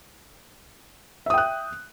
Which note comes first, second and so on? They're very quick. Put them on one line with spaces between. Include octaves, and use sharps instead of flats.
E5 D#6 G5 F#6